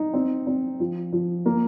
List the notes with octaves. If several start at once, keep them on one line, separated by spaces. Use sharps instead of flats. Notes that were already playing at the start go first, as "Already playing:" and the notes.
Already playing: D#4
C4
C4
F3
F3
A#3